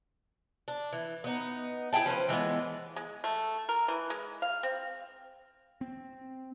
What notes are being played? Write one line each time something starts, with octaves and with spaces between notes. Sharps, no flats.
D4
E3
B3 D#4
E4 G#4 G5 A5
F3 C#4 B4 C5
E3 G#3 A#3 B3
G#3
A3
A#4
E3
G#3
F5
C4
C4